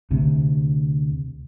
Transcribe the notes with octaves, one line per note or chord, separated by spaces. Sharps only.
D2 C3